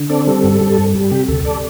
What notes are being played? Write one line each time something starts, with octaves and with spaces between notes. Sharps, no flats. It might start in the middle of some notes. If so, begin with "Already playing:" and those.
Already playing: D3
C4 A4 D5
G3 A4
G2
G3
G2
G3
C3 G4
D2 A4
A4 D5